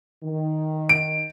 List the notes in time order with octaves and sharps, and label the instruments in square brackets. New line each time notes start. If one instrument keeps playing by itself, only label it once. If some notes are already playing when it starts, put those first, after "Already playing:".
[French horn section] D#3
[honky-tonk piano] D7